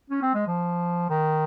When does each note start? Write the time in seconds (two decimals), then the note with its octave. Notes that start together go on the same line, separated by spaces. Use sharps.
0.10 C#4
0.22 C4
0.35 G#3
0.47 F3
1.10 D#3